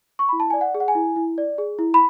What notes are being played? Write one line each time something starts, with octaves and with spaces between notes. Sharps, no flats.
C#6
E4 B5
A5
D5 G#5
F#5
G#4
F#5
G#5
E4
E4
D5
G#4
E4
B5